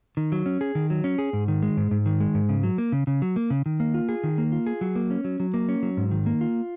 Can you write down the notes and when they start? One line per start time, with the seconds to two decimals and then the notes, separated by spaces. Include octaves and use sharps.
0.17 D#3
0.32 F#3
0.46 C#4
0.61 G#4
0.75 D#3
0.90 F#3
1.04 C#4
1.18 G#4
1.33 G#2
1.48 D#3
1.63 G#3
1.77 G#2
1.91 G#2
2.06 D#3
2.20 G#3
2.34 G#2
2.49 C#3
2.63 F#3
2.78 A#3
2.92 C#3
3.07 C#3
3.22 F#3
3.36 A#3
3.50 C#3
3.66 D#3
3.80 A#3
3.94 F4
4.09 G#4
4.24 D#3
4.38 A#3
4.52 F4
4.67 G#4
4.81 F#3
4.95 A#3
5.11 C#4
5.24 F#3
5.40 F#3
5.54 A#3
5.69 C#4
5.83 F#3
5.97 G#2
6.11 D#3
6.26 A#3
6.41 F4